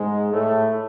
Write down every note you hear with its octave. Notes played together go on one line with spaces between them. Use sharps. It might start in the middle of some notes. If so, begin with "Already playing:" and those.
Already playing: G#2 G#3
A2 A3